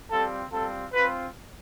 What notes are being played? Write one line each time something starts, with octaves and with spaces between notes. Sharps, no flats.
G3 C4 F4 A4
G3 C4 F4 A4
C4 F4 B4